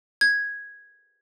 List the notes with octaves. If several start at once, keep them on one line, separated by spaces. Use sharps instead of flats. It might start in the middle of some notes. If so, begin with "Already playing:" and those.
G#6